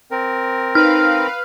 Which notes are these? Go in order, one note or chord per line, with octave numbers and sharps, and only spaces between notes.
C4 A#4
D#4 B4 F5 F6